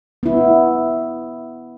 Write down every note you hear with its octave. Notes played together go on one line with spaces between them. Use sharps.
B3 E4